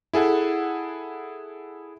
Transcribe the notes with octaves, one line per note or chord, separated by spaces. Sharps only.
E4 G#4 A4 F#5